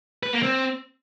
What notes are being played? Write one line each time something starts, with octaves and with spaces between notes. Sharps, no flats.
B4
A#3
C4